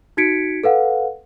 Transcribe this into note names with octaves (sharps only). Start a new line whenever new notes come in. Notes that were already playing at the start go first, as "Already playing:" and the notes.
D#4 F#4 G#6 B6 C#7 D7
A4 B4 F5 F#5